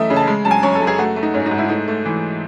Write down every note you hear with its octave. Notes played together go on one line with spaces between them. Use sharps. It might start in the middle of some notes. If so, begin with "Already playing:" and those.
Already playing: F#2 E3 A3 D#5 E5
C#3
A5
G#3
F#2 A5
G#5
F#2 C#5
A4
F#2
G#4
A3 F#4
A3
D#4
G#2 C#4
D#4
G#2
E4
A3 D#4
A3
E3